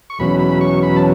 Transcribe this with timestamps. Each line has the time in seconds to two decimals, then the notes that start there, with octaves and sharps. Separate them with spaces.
0.10 C#6
0.19 E2 B2 F#3 C#4 B5
0.40 B5
0.61 C#6
0.83 B5
0.96 A5